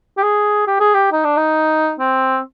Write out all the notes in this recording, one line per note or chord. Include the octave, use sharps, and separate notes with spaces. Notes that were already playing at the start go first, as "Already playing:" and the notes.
G4
G#4
G4
G#4
G4
D#4
D4
D#4
C4